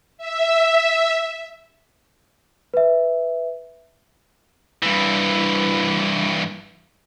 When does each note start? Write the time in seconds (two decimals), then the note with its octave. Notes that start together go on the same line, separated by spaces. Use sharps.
0.18 E5
2.74 B4 E5
4.83 G2 E3